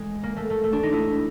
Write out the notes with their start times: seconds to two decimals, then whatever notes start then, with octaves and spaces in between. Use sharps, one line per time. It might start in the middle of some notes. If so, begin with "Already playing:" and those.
Already playing: G#3
0.23 A#3
0.36 A3
0.50 A3
0.64 A3
0.73 D4
0.83 D#4
0.93 E4